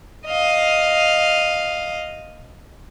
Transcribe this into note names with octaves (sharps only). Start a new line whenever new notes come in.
D#5 F5